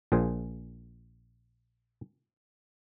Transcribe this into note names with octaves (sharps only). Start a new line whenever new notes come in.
A#1 A#2 G#4 C5